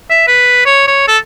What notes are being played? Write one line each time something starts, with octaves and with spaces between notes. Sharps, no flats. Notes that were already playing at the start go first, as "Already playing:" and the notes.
E5
B4
C#5
C#5
A4